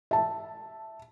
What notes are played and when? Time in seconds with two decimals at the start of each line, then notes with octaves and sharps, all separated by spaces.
0.11 E5 A5